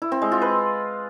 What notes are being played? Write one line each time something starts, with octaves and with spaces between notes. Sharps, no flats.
E4
C4
G#3
F4
B4